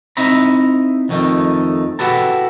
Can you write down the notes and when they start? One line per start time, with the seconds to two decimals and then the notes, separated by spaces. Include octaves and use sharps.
0.17 C4 D#4 E4 E5 A#5 B5
1.09 F2 D#3 A3
1.99 E4 F#4 G4 A4 B4 A5